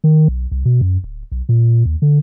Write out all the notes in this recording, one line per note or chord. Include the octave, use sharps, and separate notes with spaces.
D#3
B1
C2
B2
F#2
D1
B1
A#2
D#2
D3